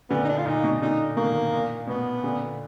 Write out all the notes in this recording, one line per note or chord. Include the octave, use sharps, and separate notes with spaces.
A#2 D3 B3
D#4
D4
F4
A#2 D#4
B2
A#2 D3 D#4
B2 D#3 A#3
A#2
B2 B3
A#2 D3